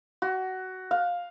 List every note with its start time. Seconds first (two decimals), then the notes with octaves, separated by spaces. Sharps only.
0.22 F#4
0.91 F5